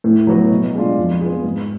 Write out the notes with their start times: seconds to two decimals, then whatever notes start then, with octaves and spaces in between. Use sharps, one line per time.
0.04 A2
0.27 F#3 B3 F#4
0.51 B2
0.74 G#3 D4 F4
0.98 F2
1.20 F3 B3 F4 G#4
1.44 G#2